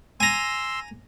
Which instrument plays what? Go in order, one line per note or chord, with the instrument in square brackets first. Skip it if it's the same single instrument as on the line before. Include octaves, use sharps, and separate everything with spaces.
[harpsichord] G#5 A#5 [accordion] C6 E6